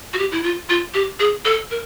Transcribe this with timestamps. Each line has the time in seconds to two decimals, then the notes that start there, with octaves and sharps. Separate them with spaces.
0.13 F#4
0.19 G4
0.32 E4
0.44 F4
0.69 F4
0.94 G4
1.20 G#4
1.45 A4
1.71 A#4